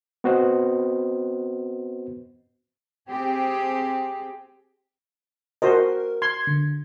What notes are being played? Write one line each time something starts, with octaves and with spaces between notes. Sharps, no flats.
B3 C4 F#4 B4 C5 D#5
C4 G4 G#4
F#4 A#4 C5 D#5
C6 G#6
D3